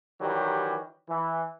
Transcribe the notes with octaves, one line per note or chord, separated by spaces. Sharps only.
D#3 E3 F#3 G3 G4
E3